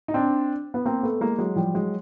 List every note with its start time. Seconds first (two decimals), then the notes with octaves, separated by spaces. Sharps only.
0.08 D#4
0.14 C4 D4
0.74 B3
0.85 A#3 C4
1.03 A3 B3
1.21 G#3 A#3
1.38 F#3 G#3
1.56 F3 G3
1.74 F#3 G#3